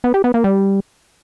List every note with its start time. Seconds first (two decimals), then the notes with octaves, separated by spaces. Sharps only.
0.04 B3
0.14 G4
0.24 B3
0.34 A#3
0.44 G3